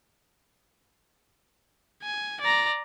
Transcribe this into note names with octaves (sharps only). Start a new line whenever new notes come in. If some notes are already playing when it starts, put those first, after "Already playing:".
G#5
D5 A#5